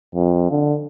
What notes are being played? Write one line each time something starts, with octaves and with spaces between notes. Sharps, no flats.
F2
D3